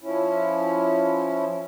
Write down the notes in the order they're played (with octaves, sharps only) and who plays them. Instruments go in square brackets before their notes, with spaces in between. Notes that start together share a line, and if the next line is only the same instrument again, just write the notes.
[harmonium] F3 C#4 E4